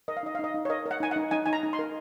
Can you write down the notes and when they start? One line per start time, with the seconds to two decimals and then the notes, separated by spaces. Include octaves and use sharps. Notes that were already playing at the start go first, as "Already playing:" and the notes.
0.08 A#4 D#5
0.17 F5
0.23 D#4 D#5
0.35 F5
0.39 D#4 D#5
0.54 D#4
0.65 C#5
0.70 A#4 D#5
0.86 A#4
0.91 F#5
1.00 D#4 G#5
1.11 D#4 F#5
1.31 D#4 G#5
1.46 D#4 G#5
1.53 A#5
1.63 D#4
1.73 C6
1.79 A#4